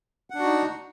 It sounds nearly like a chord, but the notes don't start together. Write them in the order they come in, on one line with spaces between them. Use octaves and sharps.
F#5 D4 F#4 D#4